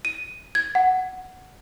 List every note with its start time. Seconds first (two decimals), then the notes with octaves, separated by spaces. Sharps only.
0.05 D#7
0.55 G#6
0.75 F#5